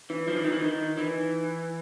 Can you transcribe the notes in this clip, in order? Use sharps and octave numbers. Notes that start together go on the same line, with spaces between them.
E3
F3
E3
D#3
E3
D#3
E3